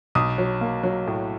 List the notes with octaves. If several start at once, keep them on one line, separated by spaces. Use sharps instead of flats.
B1 D#6
F#3
A#3
F#3
A2